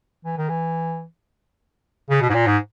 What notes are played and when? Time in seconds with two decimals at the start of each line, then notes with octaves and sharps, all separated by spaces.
0.25 E3
0.37 D#3
0.49 E3
2.10 C#3
2.21 B2
2.29 G#2
2.34 A#2
2.46 G#2